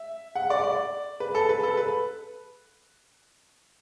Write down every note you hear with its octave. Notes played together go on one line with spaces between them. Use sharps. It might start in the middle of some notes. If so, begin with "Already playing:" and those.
Already playing: E5
F#5
D5
D5
B4
A4
B4
A4
B4